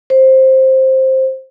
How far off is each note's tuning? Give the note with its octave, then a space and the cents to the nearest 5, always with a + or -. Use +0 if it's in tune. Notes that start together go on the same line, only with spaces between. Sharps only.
C5 +10